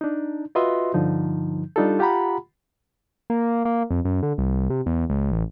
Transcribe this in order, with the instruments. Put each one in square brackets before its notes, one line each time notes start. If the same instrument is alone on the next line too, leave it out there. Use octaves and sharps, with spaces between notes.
[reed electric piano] D4 D#4
F4 F#4 B4 D#5 E5 C6
G2 D3 F3 D#4
G3 D4 D#4 F4 G4 A4
F4 G4 F#5 A#5 B5
[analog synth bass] A#3
A#3
F2
F#2
D3
C2
C3
E2
C#2
A1